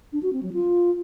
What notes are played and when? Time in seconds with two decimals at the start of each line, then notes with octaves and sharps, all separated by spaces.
0.13 D4
0.23 F#4
0.33 C4
0.43 F#3
0.53 F4